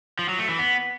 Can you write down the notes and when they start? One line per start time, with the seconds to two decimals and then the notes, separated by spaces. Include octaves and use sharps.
0.19 F3
0.29 F#3
0.39 A3
0.49 E3
0.59 B3